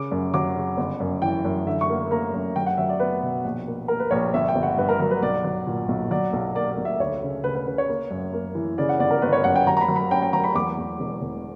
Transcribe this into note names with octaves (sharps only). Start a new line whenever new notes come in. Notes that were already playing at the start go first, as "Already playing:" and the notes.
Already playing: C#3 D6
F#2
F#3 D6
C#3
G1
F#2
E3 G5
F#2
D3 E5
C#6
A#3
A#3 A#5
F#2
F#3 G5
F#5
F#3 E5
D5
B3 B4
B2
A#1
A#3
A#3 A#4
B4
A#1 C#5
G1 E5
G5
G1
F#5
G2 B4
A#4
F#3 A#4
B4
B1 D5
F#3
A#2
B1
F#3 D5
B1
A#3 D5
D5
B1
E5
D2 C#5
C#3
C#3 B4
B4
C#3 B4
C#5
A#3
F#2
A#3
E3
C#3 D5
F#5
G1 D5
A#4
G1 B4
C#5
F#2 F#5
G5
F#3 A#5
A#5
B5
F#3
B5
C#4 G5
G5
F#3 A#5
B5
E2 D6
E2
E1
E1